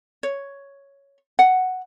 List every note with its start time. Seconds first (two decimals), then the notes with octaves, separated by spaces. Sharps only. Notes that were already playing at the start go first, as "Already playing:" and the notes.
0.23 C#5
1.39 F#5